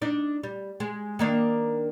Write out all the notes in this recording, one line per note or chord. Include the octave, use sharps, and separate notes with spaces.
D4 D#4 D5
G3
G#3
D#3 A#3 D4